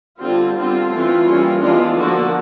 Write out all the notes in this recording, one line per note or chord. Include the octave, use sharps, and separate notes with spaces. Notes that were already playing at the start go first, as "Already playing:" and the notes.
D3 G3 C4 F4
D3 G3 C4 F4
E3 A3 C4
E3 G3 A#3 C#4
E3 G#3 B3 D4 F4
D3 F3 A#3 F#4